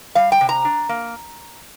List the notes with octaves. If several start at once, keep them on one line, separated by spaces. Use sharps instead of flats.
G3 F5
G5
C3
A#5
D4
A#3